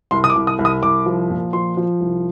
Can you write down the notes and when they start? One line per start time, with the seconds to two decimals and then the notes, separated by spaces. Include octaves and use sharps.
0.11 C2 C6
0.24 D#6
0.30 D6
0.36 C2
0.47 D#6
0.59 C2
0.65 D#6
0.82 C2 D6
1.06 F3
1.30 A#2
1.53 F3 C6
1.77 F3
2.01 C2